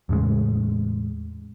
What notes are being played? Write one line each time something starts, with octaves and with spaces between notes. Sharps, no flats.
E2 A2 C#3 G#3